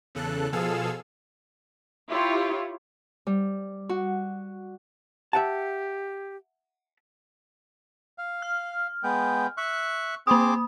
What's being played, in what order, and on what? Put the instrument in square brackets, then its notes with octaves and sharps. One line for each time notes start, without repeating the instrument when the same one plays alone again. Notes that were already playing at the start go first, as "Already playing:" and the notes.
[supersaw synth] E2 C#3 A4 F#6
B2 F3 G#4 A4 F5 E6
[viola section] E4 F4 G4 C#5
[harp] G3
F#4
[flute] G4 [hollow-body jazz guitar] E5 F#5 A5
[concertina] F5
[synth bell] F6
[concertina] G#3 B3 G5
E5 C#6 F#6
[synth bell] A#3 D#6 [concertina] C4 G#4 D6